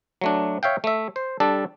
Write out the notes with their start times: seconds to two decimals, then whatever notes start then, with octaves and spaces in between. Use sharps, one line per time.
0.21 F#3 A3 D4
0.63 C#5 E5 F5 G5
0.84 A3 E5
1.16 C5
1.40 G3 D4 A4